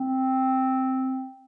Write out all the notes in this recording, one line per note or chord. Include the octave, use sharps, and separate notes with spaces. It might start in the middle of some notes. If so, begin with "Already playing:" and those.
Already playing: C4